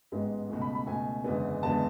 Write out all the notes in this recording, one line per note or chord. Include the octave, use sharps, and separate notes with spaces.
A1 G#2 G#3 B3
C#2 B2 A3
B5
B5
C#2 B2 A3 G#5
F#1 E2 D3 G#3 B3
F#1 E2 D3 G#3 B3 A5